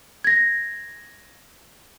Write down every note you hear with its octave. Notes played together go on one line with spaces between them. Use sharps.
G#6 A#6